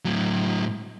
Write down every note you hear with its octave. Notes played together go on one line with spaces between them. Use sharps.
A2 F#3